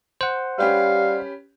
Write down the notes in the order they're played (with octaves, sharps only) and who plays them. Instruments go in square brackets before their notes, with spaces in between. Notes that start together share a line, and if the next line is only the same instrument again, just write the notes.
[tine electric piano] C5 F#5
[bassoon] G3 [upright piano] C#4 G4 B4 [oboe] F5